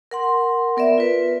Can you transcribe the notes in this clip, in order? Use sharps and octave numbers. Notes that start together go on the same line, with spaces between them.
A#4 F#5 C6
B3 A#4 D5 E5
F4 B4